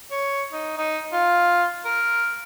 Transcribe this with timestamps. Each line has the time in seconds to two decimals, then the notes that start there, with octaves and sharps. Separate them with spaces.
0.11 C#5
0.52 D#4
0.78 D#4
1.12 F4
1.85 A#4